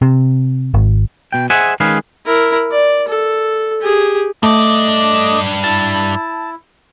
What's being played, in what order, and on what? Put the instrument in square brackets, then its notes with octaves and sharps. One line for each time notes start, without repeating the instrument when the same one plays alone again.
[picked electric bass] C3
G#1
[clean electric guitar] B2 G5
G#4 C5 D#5 E5 F#5 G#5
D#3 G#3 C#4 G#4 B4 F5
[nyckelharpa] E4 A#4
D5
A4
G4 G#4
[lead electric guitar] G2 D5 [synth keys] A3 [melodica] D#5 D6 D#6
[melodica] E4 [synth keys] A5